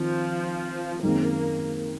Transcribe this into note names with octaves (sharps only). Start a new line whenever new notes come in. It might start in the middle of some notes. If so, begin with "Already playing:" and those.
Already playing: D#3 F3 C4
F#2 D#3 G#3 A#3 C4 D#4